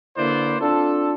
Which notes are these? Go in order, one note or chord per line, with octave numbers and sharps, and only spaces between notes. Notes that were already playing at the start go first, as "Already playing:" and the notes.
D3 A#3 E4 B4 C5 D5
C4 D4 F4 A4